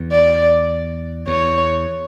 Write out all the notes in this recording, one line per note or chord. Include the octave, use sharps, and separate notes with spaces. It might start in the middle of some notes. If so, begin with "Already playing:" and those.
Already playing: E2
D5
E2 C#5